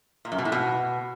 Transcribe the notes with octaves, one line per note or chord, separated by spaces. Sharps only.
A#2
F#2
B2
A2
B2